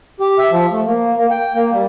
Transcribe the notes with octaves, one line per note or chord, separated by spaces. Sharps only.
G4
E5
F3
A3
A#3
A#3
G5
A#3
G3